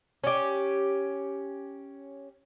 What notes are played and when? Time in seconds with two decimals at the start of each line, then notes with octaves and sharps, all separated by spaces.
0.24 C#4 G4